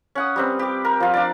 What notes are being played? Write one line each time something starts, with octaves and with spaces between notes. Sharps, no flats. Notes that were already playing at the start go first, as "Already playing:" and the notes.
C#4 F#5 D#6
G3 C4 B4
G4 D6
A#4
F3 F4
D4 D5